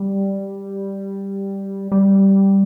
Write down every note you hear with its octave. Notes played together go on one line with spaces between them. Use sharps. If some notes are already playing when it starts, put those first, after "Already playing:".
Already playing: G3
G3